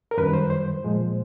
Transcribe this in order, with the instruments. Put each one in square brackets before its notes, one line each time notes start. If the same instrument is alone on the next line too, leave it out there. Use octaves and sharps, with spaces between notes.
[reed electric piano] A#4
F#2 D#3 G3 B4
C5
C5
A#2 F3 G#3